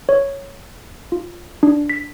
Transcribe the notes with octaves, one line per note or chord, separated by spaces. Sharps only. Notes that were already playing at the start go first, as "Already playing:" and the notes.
C#5
F4
D4
B6